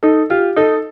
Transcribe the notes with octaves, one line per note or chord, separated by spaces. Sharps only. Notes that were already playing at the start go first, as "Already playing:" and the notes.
D#4 A4
F4 G4
D#4 A4